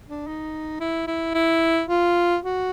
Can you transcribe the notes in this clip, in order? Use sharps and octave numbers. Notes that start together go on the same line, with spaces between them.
D4
D#4
E4
E4
E4
F4
F#4